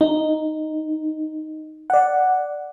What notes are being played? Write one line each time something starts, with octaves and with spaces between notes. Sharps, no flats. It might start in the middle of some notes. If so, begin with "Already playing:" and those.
D#4
D5 F#5